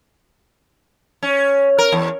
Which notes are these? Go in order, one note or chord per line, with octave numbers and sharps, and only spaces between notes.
C#4
A#4
E2